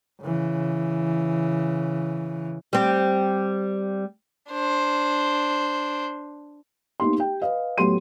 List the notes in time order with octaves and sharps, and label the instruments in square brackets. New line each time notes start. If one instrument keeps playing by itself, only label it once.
[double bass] C#3 E3
[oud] G3 C4
[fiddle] D4 C5
[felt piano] A#3 B3 D#4 G4 C6
G4 G5
B4 D#5 F5
A2 F#3 B3 G4 C6 D#7